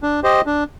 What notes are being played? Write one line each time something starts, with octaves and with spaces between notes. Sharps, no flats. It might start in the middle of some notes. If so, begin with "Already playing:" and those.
D4
G4 C5 D#5
D4